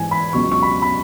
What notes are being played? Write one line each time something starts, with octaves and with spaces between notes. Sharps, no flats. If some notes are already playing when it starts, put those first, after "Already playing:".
Already playing: G#2 E3 G#5
B5
C#2 B2 F#3 C#6
C#6
B5
B5